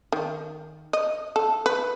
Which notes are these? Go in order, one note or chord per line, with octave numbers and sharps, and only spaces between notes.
D#3
D#5
A4
B4